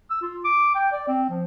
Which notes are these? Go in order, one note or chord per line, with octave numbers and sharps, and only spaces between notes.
E6
F4
D6
G5
D5
C4
F3